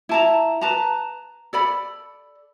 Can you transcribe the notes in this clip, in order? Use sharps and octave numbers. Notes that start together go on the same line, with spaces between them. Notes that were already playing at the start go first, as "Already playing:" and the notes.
E4 A5 A#5
B4 A5 A#5
A4 D5 B5